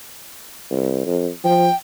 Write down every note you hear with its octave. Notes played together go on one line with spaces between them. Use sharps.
C2
F2
F3 G5